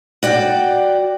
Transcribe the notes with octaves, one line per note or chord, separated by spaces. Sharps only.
F#4 D5 G5